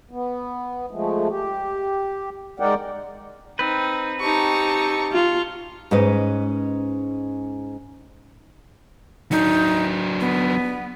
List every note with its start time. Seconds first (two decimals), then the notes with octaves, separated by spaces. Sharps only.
0.11 B3
0.91 F3 G#3 A3
1.30 G4
2.60 G#3 D#4 A#4 D5 F#5 G5
3.59 C4 D#4 B4
4.21 D#4 G4 A5 C#6
5.13 F4
5.91 G#2 C#4 B4 D#5
9.31 F#3 D4 D#4
10.20 B3